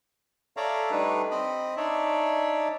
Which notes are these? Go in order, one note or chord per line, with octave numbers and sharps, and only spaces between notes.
A4 C#5 D5 E5 F5 A#5
G3 A3 D4 D#4 B4
C4 D#5 B5
D4 D#4 C#5 D5 E5